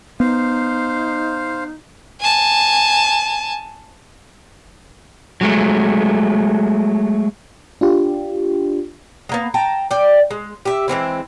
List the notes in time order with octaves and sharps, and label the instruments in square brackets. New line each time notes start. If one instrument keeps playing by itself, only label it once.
[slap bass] B3 [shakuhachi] D#4 [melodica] C5 F5
[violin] G#5 A5
[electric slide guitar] F#3 G#3 A3
[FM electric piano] D4 F4 G4
[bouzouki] G#3 A#3 B3
G5 A5 A#5
D5 G5
G#3
G4 E5
E3 G#3 C4 E4